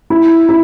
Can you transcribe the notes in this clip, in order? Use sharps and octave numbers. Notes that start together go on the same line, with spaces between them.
E4
E4